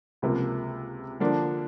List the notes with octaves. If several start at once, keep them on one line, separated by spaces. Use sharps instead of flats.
C#2 C3 F3 A#3
D3 F3 A#3 D4